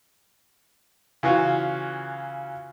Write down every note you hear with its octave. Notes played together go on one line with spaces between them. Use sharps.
C#3 E3 F4 F#4